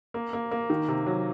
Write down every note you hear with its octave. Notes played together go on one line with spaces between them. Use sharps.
A#3
A#3
A#3
D#3
C3
F#3